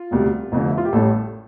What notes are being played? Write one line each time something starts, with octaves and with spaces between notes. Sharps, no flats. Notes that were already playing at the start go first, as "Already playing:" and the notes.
Already playing: F4
E1 D2 C3 G3
F1 F2 D3
E4
F4
G4
A1 A2 G3 A4